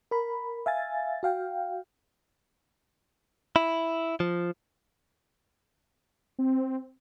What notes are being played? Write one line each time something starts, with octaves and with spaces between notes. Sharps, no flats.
A#4 B5
E5 F5 G#5 A6
F#4 F5 G5
E4
F3
C4